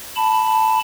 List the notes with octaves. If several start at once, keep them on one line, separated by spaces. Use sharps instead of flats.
A5 B5